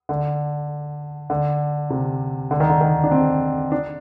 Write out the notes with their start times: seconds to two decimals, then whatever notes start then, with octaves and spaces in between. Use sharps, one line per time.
0.09 D3
1.30 D3
1.90 C3
2.51 D3
2.60 D#3
2.69 D3
2.81 D#3
3.04 D4
3.11 C4
3.72 D4